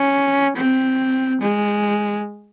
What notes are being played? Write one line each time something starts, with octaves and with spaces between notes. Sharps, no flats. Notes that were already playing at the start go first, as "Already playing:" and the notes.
Already playing: C#4
C4
G#3